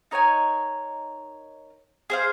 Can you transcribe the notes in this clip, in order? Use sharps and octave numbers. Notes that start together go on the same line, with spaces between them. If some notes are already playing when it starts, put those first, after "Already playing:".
D#4 A#4 C#5 G#5
G#4 C5 F5